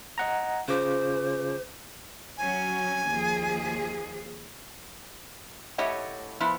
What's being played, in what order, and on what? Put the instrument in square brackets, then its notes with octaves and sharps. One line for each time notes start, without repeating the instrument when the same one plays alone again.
[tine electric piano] D#5 F#5 A#5
[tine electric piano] C#3 F4 D6 [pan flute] C5
[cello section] F#3 C#4 [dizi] G#5
[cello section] D#2 F3 G#4
[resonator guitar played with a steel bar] A2 A3 G4 C#5 D#5 F#5
F3 B3 E4 C5